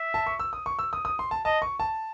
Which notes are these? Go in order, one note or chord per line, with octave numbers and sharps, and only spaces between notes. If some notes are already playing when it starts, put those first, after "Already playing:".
Already playing: E5
A5
C#6
E6
D#6
C#6
E6
D#6
D#6
C6
A5
D#5 A5
C#6
A5